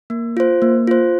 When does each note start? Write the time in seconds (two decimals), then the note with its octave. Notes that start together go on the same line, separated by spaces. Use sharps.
0.10 A#3
0.37 F4 C5
0.62 A#3
0.87 F4 C5